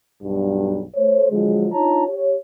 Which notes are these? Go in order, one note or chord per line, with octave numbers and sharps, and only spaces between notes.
B1 G2
A3 C5 C#5
D3 F3 F#3 G#3
D4 D#4 F4 C#5 A5 A#5
G4 C#5